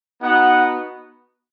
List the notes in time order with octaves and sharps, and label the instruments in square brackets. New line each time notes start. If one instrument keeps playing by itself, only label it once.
[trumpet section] B3 D#4 F#4 F#5